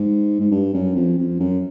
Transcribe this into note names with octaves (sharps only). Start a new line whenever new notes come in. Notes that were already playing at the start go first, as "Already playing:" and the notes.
Already playing: G#2
G#2
G2
F#2
F2
F2
F#2